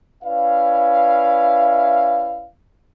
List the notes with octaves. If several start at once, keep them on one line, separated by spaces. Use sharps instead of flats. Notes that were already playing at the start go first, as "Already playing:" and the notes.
C#4 E4 B4 D5 E5 F5